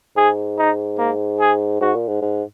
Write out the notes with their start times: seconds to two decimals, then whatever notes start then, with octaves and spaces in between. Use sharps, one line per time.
0.16 G#2 G#4
0.58 D#4
0.98 A#3
1.40 G#4
1.81 G#2 F#4
1.95 A#2
2.08 G#2
2.22 G#2